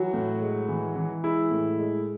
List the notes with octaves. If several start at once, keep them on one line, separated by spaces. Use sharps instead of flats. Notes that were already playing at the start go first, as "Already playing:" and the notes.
Already playing: E3 F#3 F#4
A2
G#3
E3
E3
G#3 E4
A2
G#3